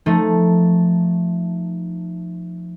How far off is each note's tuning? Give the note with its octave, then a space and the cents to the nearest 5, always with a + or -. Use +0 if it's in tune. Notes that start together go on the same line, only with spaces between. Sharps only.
F3 +0 A3 +0 D#4 +0